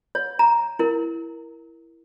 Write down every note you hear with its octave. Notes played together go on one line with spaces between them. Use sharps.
C#5
A#5
E4 A#4